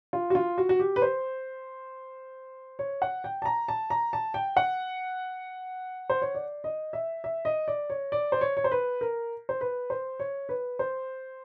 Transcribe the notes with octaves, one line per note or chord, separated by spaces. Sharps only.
F4
F#4
F4
F#4
F#4
G4
B4
C5
C#5
F#5
G5
A5
A#5
A5
A#5
A5
G5
F#5
C5
C#5
D5
D#5
E5
E5
D#5
D5
C#5
D5
C5
C#5
C#5
C5
B4
A#4
C5
B4
C5
C#5
B4
C5